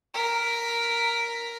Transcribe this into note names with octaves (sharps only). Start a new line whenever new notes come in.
A#4 B6